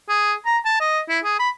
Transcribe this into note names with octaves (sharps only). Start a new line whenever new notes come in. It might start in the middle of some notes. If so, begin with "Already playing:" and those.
G#4
A#5
A5
D#5
E4
G#4
B5